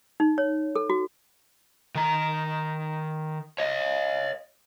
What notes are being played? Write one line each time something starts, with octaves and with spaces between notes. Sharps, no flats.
D#4
C#5
A4
F#4
D#3 A#5
C#5 D#5